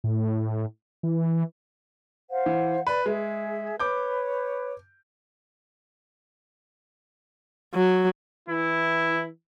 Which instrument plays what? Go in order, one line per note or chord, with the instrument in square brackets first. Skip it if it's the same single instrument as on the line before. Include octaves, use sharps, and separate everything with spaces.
[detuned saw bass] A2
E3
[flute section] C5 F5 F#5
[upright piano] E3
[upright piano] B4 [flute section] D5
[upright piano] G#3 [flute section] G#4 E5
[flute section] B4 C#5 [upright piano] D6 G6
[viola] F#3
[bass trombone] E3 [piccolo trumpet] E4